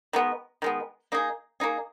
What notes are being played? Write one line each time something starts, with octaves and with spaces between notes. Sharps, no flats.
D#3 G#3 B3
D#3 G#3 B3
A#3 D#4 G#4
A#3 D#4 G#4